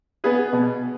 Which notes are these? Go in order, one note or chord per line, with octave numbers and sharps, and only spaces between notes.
B3 G#4 B4
B2